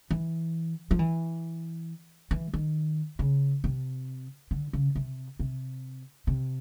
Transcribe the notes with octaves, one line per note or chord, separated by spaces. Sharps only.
E3
F3
E3
E3
D#3
C#3
C3
D3
C#3
C3
C3
C3